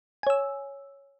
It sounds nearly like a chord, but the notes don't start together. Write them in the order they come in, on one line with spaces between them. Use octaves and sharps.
G#5 C#5 E6